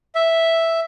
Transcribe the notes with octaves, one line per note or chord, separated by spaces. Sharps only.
E5